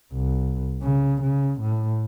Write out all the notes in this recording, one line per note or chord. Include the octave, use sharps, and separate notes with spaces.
C2
C#3
C#3
A2